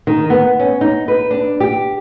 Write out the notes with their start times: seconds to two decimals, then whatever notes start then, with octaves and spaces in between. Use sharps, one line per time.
0.07 D#3
0.30 B3
0.60 C#4
0.81 D#4
1.08 B4
1.31 D4
1.60 G4